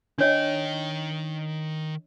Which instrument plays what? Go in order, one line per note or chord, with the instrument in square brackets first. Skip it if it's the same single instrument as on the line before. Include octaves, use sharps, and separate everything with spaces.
[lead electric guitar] D#3 G5 [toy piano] D4 C#5 D#5